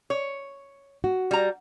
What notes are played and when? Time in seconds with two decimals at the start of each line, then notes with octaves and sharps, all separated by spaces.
0.10 C#5
1.04 F#4
1.31 G3 A#5